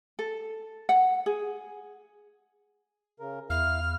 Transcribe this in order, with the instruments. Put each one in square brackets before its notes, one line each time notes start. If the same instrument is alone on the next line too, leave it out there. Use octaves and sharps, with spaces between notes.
[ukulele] A4
F#5
G#4
[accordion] C#3 A#4
[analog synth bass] E2 [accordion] E4 F5 [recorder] F6